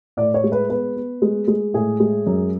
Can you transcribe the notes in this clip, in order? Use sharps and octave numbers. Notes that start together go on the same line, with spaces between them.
A2 D5
C#5
G#3
B4
B3 B4
B3
G#3
G#3
A2 G#4
G#3
F#2